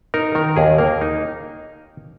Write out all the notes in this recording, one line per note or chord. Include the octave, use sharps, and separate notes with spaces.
D#4 A#4
D#3 A#4
D#2 G#4
A#3 A#4
D#4